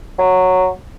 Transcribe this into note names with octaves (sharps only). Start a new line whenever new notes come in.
F#3